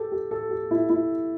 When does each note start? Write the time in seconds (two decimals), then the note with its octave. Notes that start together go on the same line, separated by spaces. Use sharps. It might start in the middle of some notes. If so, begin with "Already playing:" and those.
Already playing: G4 A4
0.12 G4
0.31 A4
0.51 G4
0.71 E4
0.90 E4